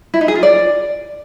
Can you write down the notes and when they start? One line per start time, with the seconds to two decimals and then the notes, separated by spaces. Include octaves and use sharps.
0.14 E4
0.21 D#4
0.28 G#4
0.35 F4
0.43 D5